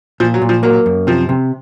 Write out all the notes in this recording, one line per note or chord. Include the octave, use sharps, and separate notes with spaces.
A#2 F3
F#3
A#2
F3
F#3 A#3
F#2
C3 F3
C3